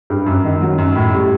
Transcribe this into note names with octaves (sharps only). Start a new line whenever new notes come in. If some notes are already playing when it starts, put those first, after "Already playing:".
G2
F#2
D#3
F#3
F#2
A2
G3